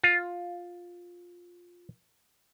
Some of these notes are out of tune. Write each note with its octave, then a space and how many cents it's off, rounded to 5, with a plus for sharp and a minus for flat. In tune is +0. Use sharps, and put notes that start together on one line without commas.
F4 +10